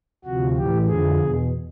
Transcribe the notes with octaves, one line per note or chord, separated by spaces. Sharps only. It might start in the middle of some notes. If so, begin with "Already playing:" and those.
D2 C3 F3 F#4
A2 E3 G4
F2 D3 F3 G#4
E2 B2